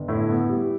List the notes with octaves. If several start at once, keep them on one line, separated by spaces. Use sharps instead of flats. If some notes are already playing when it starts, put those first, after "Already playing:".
Already playing: G1
A2 E4
B3
G3